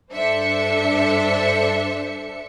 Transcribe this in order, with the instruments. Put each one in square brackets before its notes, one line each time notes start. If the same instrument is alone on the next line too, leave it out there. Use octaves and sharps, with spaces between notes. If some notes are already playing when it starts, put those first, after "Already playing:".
[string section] G2 D4 A4 C5 E5 C#7